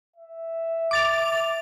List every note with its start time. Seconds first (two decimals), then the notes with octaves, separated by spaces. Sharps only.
0.16 E5
0.91 D6 A6 F7